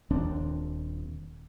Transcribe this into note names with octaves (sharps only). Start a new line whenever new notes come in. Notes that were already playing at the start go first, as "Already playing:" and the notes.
D#1 D#2 C4 D4